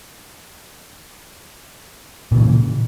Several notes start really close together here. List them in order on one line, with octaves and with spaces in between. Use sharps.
A#2 C#3 E3